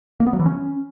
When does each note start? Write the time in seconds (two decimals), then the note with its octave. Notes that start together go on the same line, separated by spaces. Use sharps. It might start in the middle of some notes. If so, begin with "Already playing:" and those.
0.20 A#3
0.27 B3
0.33 F#3
0.39 E3
0.46 C#4